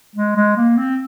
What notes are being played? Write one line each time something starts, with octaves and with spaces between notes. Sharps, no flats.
G#3
G#3
A#3
C4